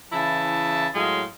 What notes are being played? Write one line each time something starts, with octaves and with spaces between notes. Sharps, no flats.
C#3 E3 E4 A5
A2 F#3 G#3 F4 F5